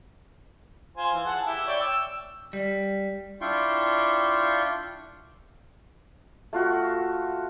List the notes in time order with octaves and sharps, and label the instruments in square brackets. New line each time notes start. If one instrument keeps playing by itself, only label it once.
[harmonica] F4 C5 G#5
E3
G#4 F#5 A5
E4 G4
C#5 D5 G5
E6
[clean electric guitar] G3
[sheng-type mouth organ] D4 E4 F4 G5 C6 C#6
[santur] A3 F4 F#4